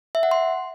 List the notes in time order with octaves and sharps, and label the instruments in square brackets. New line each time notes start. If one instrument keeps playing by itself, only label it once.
[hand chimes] E5
F#5
C6